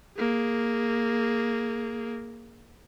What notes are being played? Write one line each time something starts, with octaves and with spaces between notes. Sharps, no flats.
A#3 G#4